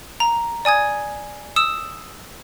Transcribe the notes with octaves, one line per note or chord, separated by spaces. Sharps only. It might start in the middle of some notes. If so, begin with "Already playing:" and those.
A#5
D5 G#5 D#6 G#6
D#6 E6 E7